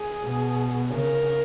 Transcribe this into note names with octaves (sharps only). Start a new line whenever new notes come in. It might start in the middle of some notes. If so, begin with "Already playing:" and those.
Already playing: G#4
B2
C#3 A#4